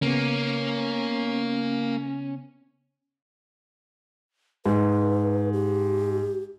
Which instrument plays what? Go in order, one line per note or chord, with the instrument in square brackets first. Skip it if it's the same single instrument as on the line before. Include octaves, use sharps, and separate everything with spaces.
[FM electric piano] C#3 B3 [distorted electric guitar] A#3 [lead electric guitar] C#4
[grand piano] G#2 [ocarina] B4
[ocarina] G4